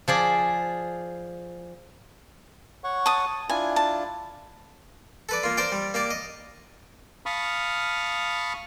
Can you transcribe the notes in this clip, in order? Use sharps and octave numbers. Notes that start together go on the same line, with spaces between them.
F3 G#4 D5
C#5 F#5 C#6
A5 D#6
D4 E4 F4 G#5
A5
A4 B4 D5
A#3 F4
A#4 C5 D5 G5
G3
A#3 G4 D5
D#5
F5 A5 B5 C#6 D#6 F6